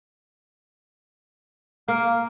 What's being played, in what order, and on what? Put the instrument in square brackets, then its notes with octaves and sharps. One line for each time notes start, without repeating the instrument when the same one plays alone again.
[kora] A#3 [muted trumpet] F5